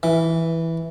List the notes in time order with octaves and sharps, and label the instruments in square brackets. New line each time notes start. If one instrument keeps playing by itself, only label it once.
[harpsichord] E3